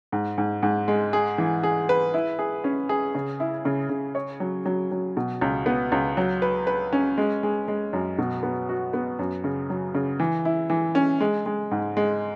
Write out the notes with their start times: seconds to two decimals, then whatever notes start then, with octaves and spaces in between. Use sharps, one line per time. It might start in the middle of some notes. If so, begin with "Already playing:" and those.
0.12 G#2
0.38 G#2
0.63 G#2
0.88 G#3
1.13 G#4
1.38 E3
1.63 G#4
1.89 B4
2.14 E4
2.39 G#4
2.64 C#4
2.89 G#4
3.15 C#3
3.40 E4
3.65 C#3
3.90 C#3
4.15 C#5
4.40 F#3
4.66 F#3
4.91 F#3
5.17 B2
5.41 C#2
5.66 B3
5.92 C#2
6.17 F#3
6.42 B4
6.67 B4
6.93 C#4
7.18 G#3
7.43 G#3
7.68 G#3
7.93 F#2
8.18 B2
8.43 B3
8.69 F#4
8.93 B3
9.19 F#2
9.44 C#3
9.70 F#3
9.95 C#3
10.20 E3
10.45 E4
10.70 E3
10.95 C#4
11.21 G#3
11.46 G#3
11.71 G#2
11.97 G#3